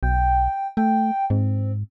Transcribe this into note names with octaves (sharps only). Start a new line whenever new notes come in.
B1 G5
A3 G5
G#2 C4